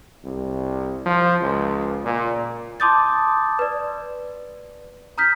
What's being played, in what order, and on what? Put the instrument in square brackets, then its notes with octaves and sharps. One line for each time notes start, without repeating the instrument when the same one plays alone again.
[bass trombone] C2
F3
C#2
A#2
[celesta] A5 C6 D6 D#6 G6 A6
B4 D5
A#5 D#6 F6 G6 B6